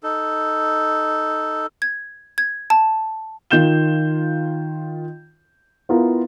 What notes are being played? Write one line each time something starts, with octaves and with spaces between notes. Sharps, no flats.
D#4 A4
G#6
G#6
A5
D#3 F4 G6 E7 G7
B3 E4 F4 A#4